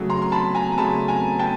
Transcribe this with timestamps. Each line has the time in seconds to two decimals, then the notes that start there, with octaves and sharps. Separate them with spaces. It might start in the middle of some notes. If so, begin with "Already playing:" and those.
Already playing: C#3 F#3 A3
0.10 A#5 C6
0.22 C6
0.32 A5 B5
0.55 G#5 A#5
0.72 A#5
0.78 C#3 F#3 A3 A5 B5
1.08 G#5 A#5
1.39 G5 A5